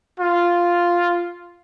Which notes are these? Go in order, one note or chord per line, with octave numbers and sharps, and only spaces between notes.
F4